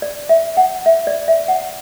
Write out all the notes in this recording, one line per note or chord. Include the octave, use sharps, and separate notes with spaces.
D5
E5
F#5
E5
D5
E5
F#5